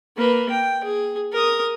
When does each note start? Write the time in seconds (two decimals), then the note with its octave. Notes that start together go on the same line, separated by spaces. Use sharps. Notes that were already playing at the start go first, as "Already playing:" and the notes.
0.17 A#3 B4
0.51 G5
0.84 G#4
1.32 A#4 D#6